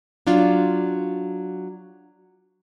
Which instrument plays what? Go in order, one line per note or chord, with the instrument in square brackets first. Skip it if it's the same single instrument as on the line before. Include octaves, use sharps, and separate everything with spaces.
[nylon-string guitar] F#3 D4 F4